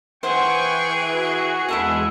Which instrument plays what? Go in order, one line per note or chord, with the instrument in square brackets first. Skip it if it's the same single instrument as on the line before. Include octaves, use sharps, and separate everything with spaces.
[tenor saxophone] E3 [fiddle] G#4 [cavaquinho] C5 F#5 [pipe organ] G5 C#6
[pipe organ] F#4
[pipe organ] E2 G#3 [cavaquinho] E4 A4 F#5